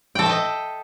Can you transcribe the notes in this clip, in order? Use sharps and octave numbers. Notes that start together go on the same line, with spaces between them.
A4 D#5 E5 G5 A5